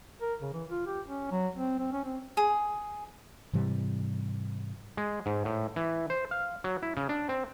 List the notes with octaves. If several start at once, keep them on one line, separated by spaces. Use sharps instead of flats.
A#4
C#3
E3
F4
G4
C#4
F#3
C4
C4
C#4
C4
G#4
G#2 C3 E3 G3
G#3
G#2
A2
E3
C5
F5
F#3
E4
C#3
D4
C4